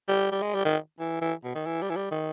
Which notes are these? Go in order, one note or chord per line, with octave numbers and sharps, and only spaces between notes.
G3
G3
G#3
G3
D#3
E3
E3
B2
D#3
E3
G3
E3
G3
D#3